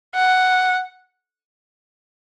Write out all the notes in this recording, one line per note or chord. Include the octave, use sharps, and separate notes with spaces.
F#5